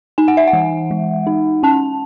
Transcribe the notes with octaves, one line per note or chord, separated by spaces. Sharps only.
D#4 G#5
F#5
E5
F#5
E3
G#3
D#4
C#4 A5